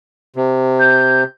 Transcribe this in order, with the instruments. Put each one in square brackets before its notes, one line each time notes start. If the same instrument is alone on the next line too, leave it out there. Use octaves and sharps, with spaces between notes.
[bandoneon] C3
[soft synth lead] G6